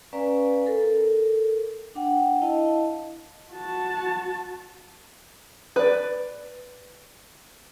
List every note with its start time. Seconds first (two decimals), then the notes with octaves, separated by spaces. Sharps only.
0.13 C#4 B4 D5 F5 G#5 A#5
0.66 A4 A#4
1.95 D4 F#5 G5
2.41 E4 D#5 F5 A5
3.53 F#4 A5
5.76 B4 D5